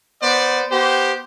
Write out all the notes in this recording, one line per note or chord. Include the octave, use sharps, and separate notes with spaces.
B3 C5 D5
B3 G4 C5